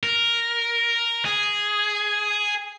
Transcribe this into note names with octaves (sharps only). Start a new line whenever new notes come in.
A#4
G#4